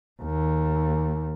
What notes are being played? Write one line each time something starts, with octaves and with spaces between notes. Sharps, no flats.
D#2